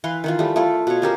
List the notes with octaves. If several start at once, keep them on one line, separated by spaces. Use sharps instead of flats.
E3 B4 F5 C6
D#3 E3 F4
G3 A3
A3 F4
B2 C#5
C#4 G4 A#4 C5